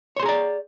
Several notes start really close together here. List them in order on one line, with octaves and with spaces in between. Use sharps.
C#5 C6 G#4 A#5 D5